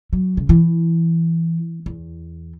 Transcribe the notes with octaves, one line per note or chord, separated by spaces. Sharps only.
F#3
C#3
E3
E2